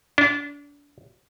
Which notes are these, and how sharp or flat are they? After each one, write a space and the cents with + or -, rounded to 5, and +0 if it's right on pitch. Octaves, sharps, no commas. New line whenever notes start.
D4 -30